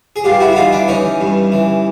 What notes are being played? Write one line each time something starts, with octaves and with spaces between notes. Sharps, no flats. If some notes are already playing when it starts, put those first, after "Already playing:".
G#4
G2 F4 G4
E4 F#4
E4
E3 D#4 F4
D4 E4
E3 C#4 D#4
G2
E3